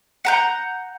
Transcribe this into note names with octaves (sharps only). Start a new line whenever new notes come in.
F#5 A#5 G6